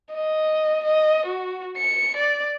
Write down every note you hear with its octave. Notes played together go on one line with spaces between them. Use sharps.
D#5
D#5
F#4
C#7
D5